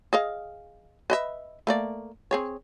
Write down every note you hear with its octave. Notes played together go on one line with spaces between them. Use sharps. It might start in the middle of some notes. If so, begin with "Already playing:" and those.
G#4 D#5 F5
B4 D#5 E5
A3 A#3 D5
C4 G#4 C#5